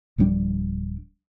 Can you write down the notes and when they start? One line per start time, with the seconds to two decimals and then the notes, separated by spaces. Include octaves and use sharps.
0.18 D1 F3 G3 D4